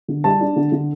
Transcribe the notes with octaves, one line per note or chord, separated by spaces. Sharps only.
D3
G3 A5
D4
D3
D3